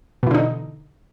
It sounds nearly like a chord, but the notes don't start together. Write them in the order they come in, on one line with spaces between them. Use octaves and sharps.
B2 E3 D3 D#4